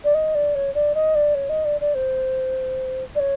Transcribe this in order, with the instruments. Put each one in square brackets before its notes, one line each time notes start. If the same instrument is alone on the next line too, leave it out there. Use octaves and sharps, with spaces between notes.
[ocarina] D5
D#5
D5
C#5
D5
D#5
D5
C#5
D#5
D5
D5
C5
D5
C#5